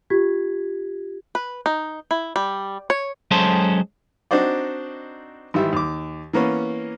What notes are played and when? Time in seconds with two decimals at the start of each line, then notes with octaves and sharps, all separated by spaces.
0.10 F4 G4 G#6 B6
1.35 B4
1.66 D#4
2.11 E4
2.36 G3
2.90 C#5
3.31 F#3 G#3 C#4 A4 C5 A5
4.31 C4 D4 D#4 F#4 C5 D5
5.54 G#1 E3 G3 E5
5.73 D#2 D6
6.33 E3 A#3 B3 C#4